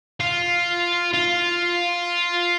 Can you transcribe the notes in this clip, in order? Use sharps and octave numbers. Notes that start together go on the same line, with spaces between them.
F4
F4